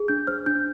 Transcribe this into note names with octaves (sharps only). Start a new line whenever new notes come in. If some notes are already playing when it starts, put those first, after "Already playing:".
Already playing: G#4
D4 G6
C5 F6
D4 G6